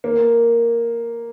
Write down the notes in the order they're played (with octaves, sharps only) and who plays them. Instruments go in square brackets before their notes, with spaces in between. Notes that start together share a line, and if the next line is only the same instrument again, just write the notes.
[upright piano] A#3